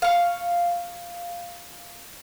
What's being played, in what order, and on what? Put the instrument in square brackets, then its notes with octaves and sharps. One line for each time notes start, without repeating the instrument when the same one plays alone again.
[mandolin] F5 C#6